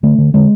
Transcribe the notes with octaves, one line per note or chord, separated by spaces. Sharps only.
D3 A3
D3
D3 G#3